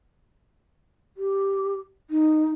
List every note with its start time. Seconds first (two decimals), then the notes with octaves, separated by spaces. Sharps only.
1.17 G4
2.10 D#4